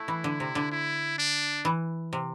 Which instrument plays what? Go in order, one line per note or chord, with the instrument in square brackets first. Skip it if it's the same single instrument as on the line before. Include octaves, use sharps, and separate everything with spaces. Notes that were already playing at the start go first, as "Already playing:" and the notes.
Already playing: [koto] A3 [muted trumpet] E4
[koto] E3
D3
C3
D3
[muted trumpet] E4
D4
[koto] E3
C3